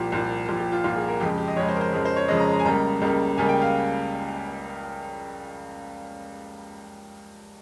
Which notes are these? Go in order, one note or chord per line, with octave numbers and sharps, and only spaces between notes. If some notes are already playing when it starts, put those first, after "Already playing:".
Already playing: C2 A#2 F3 G4
C2 A#2 F3
C2 A#2 F3 G4
G4
F4
C2 A#2 F3 F4
G#4
A#4
F2 C#3 G#3 G4
G4
D#5
F2 C#3 G#3 C#5
C5
A#4
C5
F2 C#3 G#3 A#4
C5
C#5
F2 C#3 G#3 D#5
A#5
A#5
G#5
C#2 C#3 G3 A#3 A#5
C#2 C#3 G3 A#3
C#2 C#3 G3 A#3 G#5
G5
F5